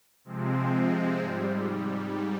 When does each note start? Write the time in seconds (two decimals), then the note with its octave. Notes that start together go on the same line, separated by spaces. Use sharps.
0.24 C3 F3 G#3 C4
1.19 G#2 G3